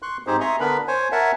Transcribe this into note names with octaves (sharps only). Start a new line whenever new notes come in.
C6 C#6 F#6
G#2 C4 D#4 G4 G#4 C5
E5 G#5 A#5 C6 C#6 D#6
D3 B3 D4 A#4 B4 B5
C5 C#5 G#5
A#4 C#5 E5 F#5 G#5 A5